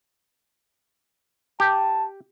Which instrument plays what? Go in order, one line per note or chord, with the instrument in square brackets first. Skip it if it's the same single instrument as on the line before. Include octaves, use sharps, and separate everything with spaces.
[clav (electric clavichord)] G4 [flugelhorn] A5